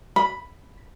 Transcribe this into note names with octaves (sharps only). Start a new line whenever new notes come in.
B5